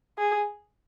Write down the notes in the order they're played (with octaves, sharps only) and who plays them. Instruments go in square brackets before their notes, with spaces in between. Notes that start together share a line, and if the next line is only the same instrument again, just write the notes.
[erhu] G#4